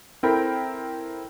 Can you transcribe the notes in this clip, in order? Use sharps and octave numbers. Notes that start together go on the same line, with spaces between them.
C4 E4 A4 A#4 G5 B5